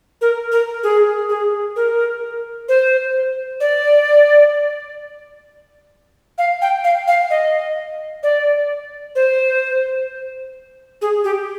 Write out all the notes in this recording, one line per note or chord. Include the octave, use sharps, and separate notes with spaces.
A#4
A#4
G#4
G#4
A#4
C5
D5
F5
G5
F5
F5
D#5
D5
C5
G#4
G4